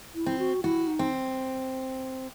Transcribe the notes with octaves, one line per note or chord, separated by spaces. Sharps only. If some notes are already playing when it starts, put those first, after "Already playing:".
E4
C4
F#4
E4 F#4
D#4
C4